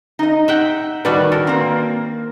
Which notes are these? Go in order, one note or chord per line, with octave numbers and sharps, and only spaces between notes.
D#4 D#5
E5 F#5 G5
D#3 G3 D4 F#4 B4
A4 A#4
A#3 C4